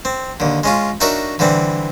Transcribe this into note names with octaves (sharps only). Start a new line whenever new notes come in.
C4
D#2 D3
G#3 C#4 F4
D4 D#4 F#4 A#4 C#5 E5
D3 E3 G3 C4